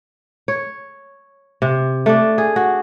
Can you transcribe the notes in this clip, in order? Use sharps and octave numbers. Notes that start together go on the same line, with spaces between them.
C#5
C3
A3 D4
G#4
F#4